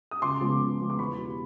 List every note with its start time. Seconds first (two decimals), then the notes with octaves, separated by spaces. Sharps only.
0.11 D#6
0.22 C#2 C6 D6
0.41 C#3 F3 G#3 B3
0.60 C#2
0.80 C#3 F3 G#3 B3
0.90 D6
0.99 E2 B5 C#6
1.17 B2 G3